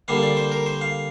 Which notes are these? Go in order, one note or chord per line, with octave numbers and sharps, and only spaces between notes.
D3 G3 A#3 F5
D5
C5
A#4
C5
F5